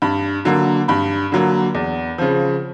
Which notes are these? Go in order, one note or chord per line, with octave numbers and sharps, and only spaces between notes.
G2 B5
D3 F#3 A#3
G2 B5
D3 F#3 A#3
E2
C#3 F3